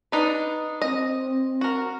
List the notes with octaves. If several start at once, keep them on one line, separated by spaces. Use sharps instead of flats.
D4 D#4 B4
C4 D#5
F#4 A#4